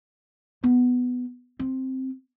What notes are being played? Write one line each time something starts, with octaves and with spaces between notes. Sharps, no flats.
B3
C4